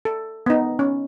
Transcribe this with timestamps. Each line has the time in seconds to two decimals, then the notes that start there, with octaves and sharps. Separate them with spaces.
0.05 A4
0.46 B3 D#4
0.79 C#4